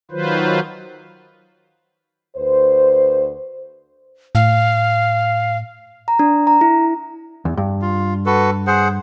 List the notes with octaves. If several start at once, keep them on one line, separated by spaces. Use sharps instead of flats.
D#3 F#3 F4 B4 C5
D2 B4 C5
A2 F5
A#5
D4
A#5
E4
E2
G2
F4
F#4 A4 B4
G#4 C5 F#5